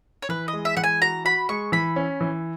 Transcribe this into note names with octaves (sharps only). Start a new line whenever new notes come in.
C#5
E3 B4
D#5
G#3
E5
E3 F#5
G#5
F#4 A#5
F#4 B5
G#3 C#6
E3 B5
C#4
E3